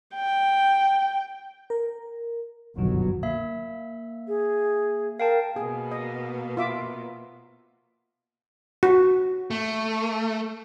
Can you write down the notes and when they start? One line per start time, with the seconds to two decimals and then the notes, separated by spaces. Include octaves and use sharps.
0.15 G5
1.70 A#4
2.77 G1 C2 F#2 B2 D#3 F#3
3.23 A#3 E5 E6
4.28 G#4
5.20 A#4 F5 G5 A5
5.56 B2 A#3 B3 G#4
5.92 D#5
6.57 F4 E5 D6
8.83 F#4
9.51 A3